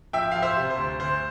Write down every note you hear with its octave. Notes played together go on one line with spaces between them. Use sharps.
F3 E5 G5
F3 F5
C5 E5
C3
C5
D2
D2 C5